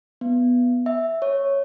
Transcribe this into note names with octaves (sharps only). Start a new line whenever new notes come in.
B3
E5
C#5